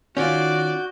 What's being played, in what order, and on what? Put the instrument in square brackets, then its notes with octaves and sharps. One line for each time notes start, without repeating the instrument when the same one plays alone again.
[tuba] D#3 [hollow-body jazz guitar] C#4 F4 [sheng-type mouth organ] F#4 G6 [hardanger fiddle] D5